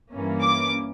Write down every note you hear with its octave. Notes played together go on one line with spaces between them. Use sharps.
G2 E3 A#3 C#4
D6